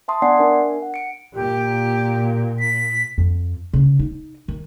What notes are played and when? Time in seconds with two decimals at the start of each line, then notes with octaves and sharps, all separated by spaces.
0.08 E5 A5 C6 D#6
0.22 B3 D4 D5 F#5 G#5 C7
0.37 D4 A#4 E5 G#5
0.82 F#5
0.94 C#7 D7
1.34 A#2 G4
2.60 B6
3.18 F2
3.73 C#3
3.99 D#4
4.48 D#3